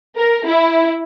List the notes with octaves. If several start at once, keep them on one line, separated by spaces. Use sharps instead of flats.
A#4
E4